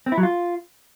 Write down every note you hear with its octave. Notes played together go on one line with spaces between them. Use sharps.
C4
E4
F#3
F4